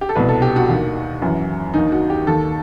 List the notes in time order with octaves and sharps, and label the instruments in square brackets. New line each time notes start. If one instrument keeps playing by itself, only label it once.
[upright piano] G4
A4
C2 B2 B4
A4
G4
F#4
D#2 D#3
F#2 E3
D#2 D#3 D#4
F#4
G4
D#2 D#3 A4